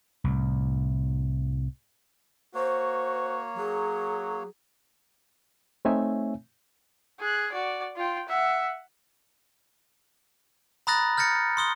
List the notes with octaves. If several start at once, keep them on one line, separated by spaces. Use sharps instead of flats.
C2 A2
A#3 F#4 C5 C#5
F#3 G#4
A3 C4 D#4 C#5 E5 G#5
G#4 F#6
F#4 D5
F4 G5
E5 F#5
A#5 B5 D#6 F#6 A6 A#6
F6 G6 A6 A#6 C#7
C6 D#6 G7